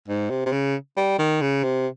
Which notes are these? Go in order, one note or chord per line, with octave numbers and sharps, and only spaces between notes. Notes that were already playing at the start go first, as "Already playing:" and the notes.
G#2
C3
C3
C#3
G3
D#3
C#3
C3